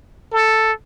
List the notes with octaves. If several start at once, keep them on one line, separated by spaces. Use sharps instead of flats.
A4